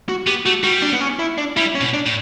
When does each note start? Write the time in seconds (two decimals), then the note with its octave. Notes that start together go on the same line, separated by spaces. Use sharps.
0.09 F#4
0.27 B3 G4
0.46 A3 F#4
0.64 G3 F#4
0.82 D4
0.93 B3
1.01 C#4
1.19 E4
1.38 D4
1.57 G3 E4
1.75 C#4
1.81 B2
1.93 D4
2.06 A2